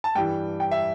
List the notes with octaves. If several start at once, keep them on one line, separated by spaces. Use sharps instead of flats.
A5
G2 E3 G3 G5
G5
E5